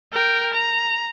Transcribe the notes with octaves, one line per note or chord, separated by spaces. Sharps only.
A#4 G5
A#5